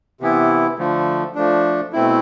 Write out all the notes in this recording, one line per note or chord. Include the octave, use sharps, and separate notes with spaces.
C3 E3 B3 E4
D3 F3 A3
F3 A3 D4
B2 A3 C4 E4